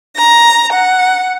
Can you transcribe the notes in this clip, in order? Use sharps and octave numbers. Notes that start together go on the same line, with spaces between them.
A#5
F#5